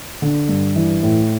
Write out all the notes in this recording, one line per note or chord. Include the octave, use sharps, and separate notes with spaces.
D3
G2
E3
A2